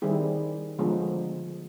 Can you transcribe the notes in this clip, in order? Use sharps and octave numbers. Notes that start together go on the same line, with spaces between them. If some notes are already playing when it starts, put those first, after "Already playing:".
D#3 G3 C4 E4 G#4
D3 F3 G#3 B3